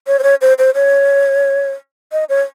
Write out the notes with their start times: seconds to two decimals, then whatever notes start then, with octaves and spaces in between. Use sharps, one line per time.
0.07 C#5
0.19 C5
0.23 C#5
0.41 C5
0.58 C5
0.75 C#5
2.12 D#5
2.29 C#5